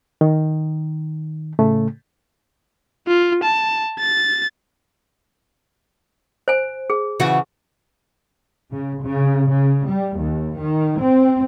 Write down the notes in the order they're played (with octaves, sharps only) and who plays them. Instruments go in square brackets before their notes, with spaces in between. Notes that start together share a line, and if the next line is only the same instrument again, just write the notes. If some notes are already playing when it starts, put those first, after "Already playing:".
[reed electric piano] D#3
A2 C#3 A3
[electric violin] F4
A5
A6
[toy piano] C5 G#5
G#4
[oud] C#3 E3 F#4
[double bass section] C#3
C#3
C#3
G3
D#2
D#3
C4